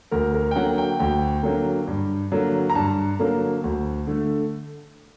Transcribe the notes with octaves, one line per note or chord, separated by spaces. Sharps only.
D2 A#4
A#4
G5
D3 F#3 A#3 F#5
G5
D2 G5
D3 F#3 A#3
G2
D3 F#3 A#3
A#5
G2 A5
D3 F#3 A#3
D2
D3 A3